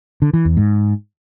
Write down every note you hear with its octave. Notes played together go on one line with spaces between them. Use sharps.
D3
E3
E2
G#2